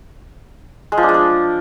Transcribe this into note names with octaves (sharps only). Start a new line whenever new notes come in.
G#3
F3
D4
G#3
D4